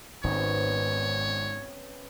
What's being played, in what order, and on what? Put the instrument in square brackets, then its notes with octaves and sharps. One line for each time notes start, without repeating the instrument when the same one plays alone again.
[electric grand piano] G#1 C#6 [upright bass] G#2 [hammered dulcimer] C3 B3 C#4 [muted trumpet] C#5